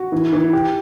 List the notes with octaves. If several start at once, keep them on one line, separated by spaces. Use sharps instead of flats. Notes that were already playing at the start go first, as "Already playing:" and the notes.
Already playing: F#4
E3
E3
G4